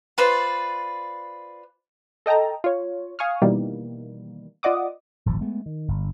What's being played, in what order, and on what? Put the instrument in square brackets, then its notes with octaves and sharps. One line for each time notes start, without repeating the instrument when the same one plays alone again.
[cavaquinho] F4 B4 C5 D5
[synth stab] A4 D#5 G5 A5 A#5
F4 C#5
F5 G#5 C#6 D#6 F6
B2 D#3 E3 G3 A#3
F4 D5 D#5 F#5 D6 D#6
[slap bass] D#1 G#1 F3
G#3 A3 B3
D#3
G1